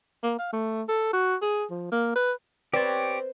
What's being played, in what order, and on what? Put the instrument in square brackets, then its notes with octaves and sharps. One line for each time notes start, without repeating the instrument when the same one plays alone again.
[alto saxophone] A#3
F5
A3
A4
F#4
G#4
F3
A#3
B4
[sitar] C4 [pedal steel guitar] G4 C#5 [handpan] B4 [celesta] D5 A6